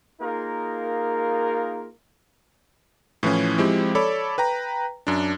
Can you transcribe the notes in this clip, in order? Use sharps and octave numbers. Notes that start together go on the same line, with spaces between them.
A#3 D#4 F4 G#4 A#4
A2 E3 F3 C#4
F3 G#3 C4 E4 G4
A4 C#5 D5 B5 D6
B4 G5 A#5
F#2 D4